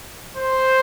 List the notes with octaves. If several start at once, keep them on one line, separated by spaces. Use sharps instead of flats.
C5